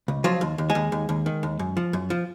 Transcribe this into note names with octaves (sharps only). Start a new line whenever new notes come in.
C#2
F3 F#3 F4
D#2
D#2
G#3 G#4
D#2
D#2
D#2
D#3
D#2
F#2
F3
F#2
F3